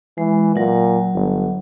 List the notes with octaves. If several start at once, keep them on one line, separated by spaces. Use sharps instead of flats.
E3 G#3
A#2 F#3 F#5
G1